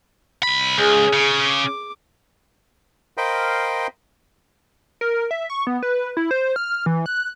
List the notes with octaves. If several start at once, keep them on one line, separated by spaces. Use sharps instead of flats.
C2 B5
C#2 G#4
C#3
D6
A#4 C5 D#5 F5 G5 B5
A#4
E5
C#6
B3
B4
E4
C5
F6
E3
F#6